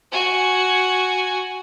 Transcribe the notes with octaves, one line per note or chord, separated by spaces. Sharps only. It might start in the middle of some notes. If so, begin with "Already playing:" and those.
F#4 G#5